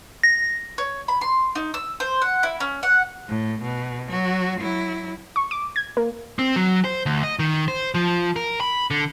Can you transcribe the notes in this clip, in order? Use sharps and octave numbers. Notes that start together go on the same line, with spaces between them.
A#6
C#5
B5
C6
D#4
E6
C5
F#5
E4
C#4
F#5
A2
B2
F#3 F#4
F#3 E4
C#6
D6
G#6
A#3
C4
F#3
C5
D2
D#5
D#3
C5
F3
A#4
B5
D3